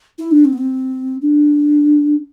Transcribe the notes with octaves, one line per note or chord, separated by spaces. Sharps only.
E4
D4
C4
B3
C4
D4